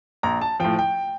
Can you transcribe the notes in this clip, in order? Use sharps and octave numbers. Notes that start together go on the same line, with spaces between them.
A#1 A#5
A5
A2 F3 G5
G5